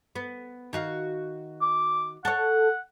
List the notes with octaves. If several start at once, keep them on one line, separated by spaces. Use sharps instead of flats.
B3
D#3 F#4 F5
D6
A4 C#5 F#5